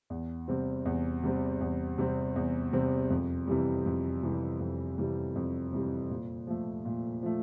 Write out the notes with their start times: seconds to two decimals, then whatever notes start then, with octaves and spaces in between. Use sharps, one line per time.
0.10 E2
0.48 C3 G3 C4
0.85 E2
1.23 C3 G3 C4
1.61 E2
1.98 C3 G3 C4
2.36 E2
2.72 C3 G3 C4
3.10 F2
3.47 C3 E3 G3
3.86 F2
4.23 C3 E3 G3
4.60 F2
4.98 C3 E3 G3
5.36 F2
5.72 C3 E3 G3
6.10 A#2
6.47 F3 A3
6.85 A#2
7.23 F3 A3